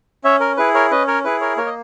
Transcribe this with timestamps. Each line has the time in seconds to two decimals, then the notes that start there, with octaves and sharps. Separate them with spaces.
0.24 C#4 C#5 E5
0.40 A#4
0.57 E4 G#4 B4
0.74 A#4 C#5
0.91 C#4 B4 D#5
1.07 A#4 C#5
1.25 E4 G#4 B4
1.41 A#4 C#5
1.57 A#3 A#4 C#5
1.66 D#5